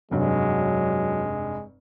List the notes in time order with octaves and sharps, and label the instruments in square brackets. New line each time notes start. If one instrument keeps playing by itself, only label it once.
[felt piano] F1 G2 [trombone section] F#3 [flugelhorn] G#3